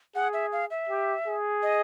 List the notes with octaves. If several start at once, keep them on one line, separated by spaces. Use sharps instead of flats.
G#4 F#5
E5
F5
E5
G4
G#4
D#5